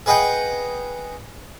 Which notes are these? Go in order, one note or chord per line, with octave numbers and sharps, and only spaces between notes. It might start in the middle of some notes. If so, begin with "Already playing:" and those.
G#4 B4 D#5 F#5 G5